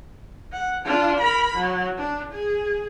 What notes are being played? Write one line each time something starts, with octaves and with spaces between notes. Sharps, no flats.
F#5
D4 F4
A#4 B5
F#3
D4
G#4